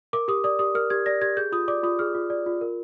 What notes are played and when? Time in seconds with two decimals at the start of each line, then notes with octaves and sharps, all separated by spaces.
0.13 A#4 D6
0.28 G4 D#6
0.44 D5 D#6
0.59 G4 D#6
0.75 A#4 F6
0.90 G4 G#6
1.06 D5 A#6
1.21 G4 G#6
1.37 G#4 G6
1.52 F4 D#6
1.68 D5 D6
1.83 F4 D#6
1.99 G#4 F6
2.15 F4
2.30 D5
2.46 F4
2.61 A#4